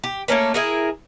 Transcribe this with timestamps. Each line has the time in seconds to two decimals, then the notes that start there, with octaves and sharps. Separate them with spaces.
0.04 G4
0.28 A3 A#3 C#4 B4
0.54 E4 G#4 A#4